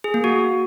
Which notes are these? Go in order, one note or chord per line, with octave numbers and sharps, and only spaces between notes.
G#4
A#3
F#4